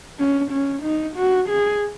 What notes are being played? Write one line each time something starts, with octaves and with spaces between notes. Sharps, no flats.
C#4
C#4
D#4
F#4
G#4